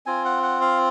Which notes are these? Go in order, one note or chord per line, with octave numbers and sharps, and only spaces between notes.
C4 F4 G#5
F#5
F#5
F5